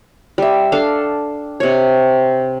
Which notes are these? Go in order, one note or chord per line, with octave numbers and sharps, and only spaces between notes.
G3 E5
D4 A4 F5
C3 C#5